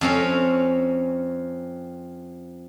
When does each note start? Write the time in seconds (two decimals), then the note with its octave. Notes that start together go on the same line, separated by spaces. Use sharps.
0.01 F2 C4 C#4